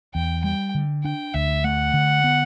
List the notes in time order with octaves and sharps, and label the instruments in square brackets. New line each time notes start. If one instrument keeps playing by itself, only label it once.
[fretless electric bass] E2 [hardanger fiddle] G5
[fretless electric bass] G3 [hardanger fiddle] G5
[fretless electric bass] D3
[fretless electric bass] D4 [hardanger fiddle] G5
[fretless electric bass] D2 [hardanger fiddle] E5
[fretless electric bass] A3 [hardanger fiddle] F#5
[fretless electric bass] D3
B3